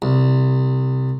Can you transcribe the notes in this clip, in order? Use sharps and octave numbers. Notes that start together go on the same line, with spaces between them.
C2